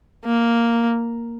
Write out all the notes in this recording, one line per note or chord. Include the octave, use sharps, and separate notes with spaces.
A#3